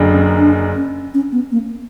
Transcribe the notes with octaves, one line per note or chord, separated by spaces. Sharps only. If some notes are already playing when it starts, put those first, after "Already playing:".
Already playing: F#1 F#2 D3
C#4
D4
C#4
C#4
B3
A#3